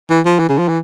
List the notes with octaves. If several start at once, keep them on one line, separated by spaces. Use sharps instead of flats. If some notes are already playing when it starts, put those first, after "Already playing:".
E3
F3
E3
C#3
F3
E3